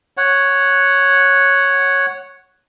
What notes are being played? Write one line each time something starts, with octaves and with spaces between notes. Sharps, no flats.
C#5 F#5